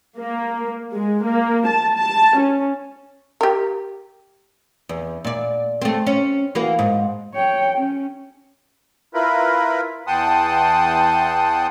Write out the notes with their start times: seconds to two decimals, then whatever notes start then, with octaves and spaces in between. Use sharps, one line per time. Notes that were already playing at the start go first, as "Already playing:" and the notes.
0.18 A#3
0.93 G#3
1.23 A#3
1.67 A5
1.95 A5
2.37 C#4
3.41 G4 A#4
4.89 E2
5.24 A#2 D5
5.82 A3 C4
6.07 C#4
6.55 E3 A#3 F#4
6.79 G#2
7.34 C#5 G5
7.78 C#4
9.14 E4 F4 A#4 B4 B5
10.07 E2 F#5 G5 A5 C6 D#6